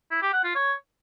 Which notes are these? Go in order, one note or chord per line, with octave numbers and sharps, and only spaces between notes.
E4
G4
F#5
F4
C#5